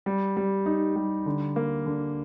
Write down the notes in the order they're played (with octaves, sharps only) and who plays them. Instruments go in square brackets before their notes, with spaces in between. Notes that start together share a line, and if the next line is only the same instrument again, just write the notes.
[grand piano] G3
G3
D#4
G3
D3
A#3
D3